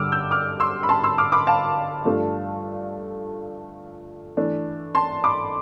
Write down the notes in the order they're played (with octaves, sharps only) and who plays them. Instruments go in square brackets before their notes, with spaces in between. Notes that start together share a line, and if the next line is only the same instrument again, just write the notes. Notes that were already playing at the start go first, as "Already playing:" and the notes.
Already playing: [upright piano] G2 D3 G3 D6 E6 F6
E6 G6
D6 F6
C6 E6
B5
A5 C6
C6 E6
D6 F6
B5 D6
F5 A5
G2 F3 A3 D4
E3 A3 D4
A5 C6
B5 D6